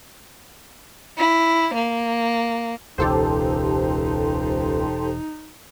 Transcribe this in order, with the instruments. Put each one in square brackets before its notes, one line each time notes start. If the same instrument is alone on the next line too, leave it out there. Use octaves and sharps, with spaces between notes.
[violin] E4
A#3
[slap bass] E1 [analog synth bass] C#2 [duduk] D#4 [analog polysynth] G4 A4 C5